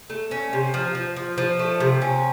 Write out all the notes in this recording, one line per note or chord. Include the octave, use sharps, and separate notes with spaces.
A3
C#4
C3
F3
F3
F3
F3
A3
C3
C#4